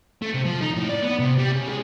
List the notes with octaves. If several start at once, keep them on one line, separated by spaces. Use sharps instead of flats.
A3
C3
F3
D#4
A2
D5
B3
C3
G3
C#3
G#3